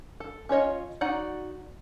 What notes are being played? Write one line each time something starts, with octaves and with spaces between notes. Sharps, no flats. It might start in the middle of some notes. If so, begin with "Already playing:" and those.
A4
C#4 F4 C#5 D#5
D#4 F#4 D5 F#5